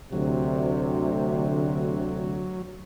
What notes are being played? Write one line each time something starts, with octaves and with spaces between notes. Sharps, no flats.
D2 C3 F#3